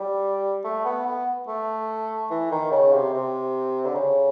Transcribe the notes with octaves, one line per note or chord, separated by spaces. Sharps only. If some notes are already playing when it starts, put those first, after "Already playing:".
Already playing: G3
A3
B3
B3
A3
E3
D#3
C#3
C3
C3
D3
C#3